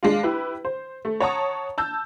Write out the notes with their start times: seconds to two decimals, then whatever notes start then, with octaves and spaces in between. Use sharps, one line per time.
0.03 G#3 D4 F4
0.23 E4 G4 B4
0.65 C5
1.05 A3
1.20 C#5 F#5 A5 A#5 C#6 D#6
1.78 A5 E6 G6